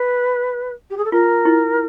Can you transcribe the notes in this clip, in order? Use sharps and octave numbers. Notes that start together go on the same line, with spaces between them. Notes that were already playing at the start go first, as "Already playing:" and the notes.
Already playing: B4
G4
G#4
A4
F4 A#4
E4